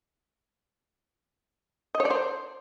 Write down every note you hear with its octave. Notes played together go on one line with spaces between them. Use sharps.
D#5
C#5
D5
C5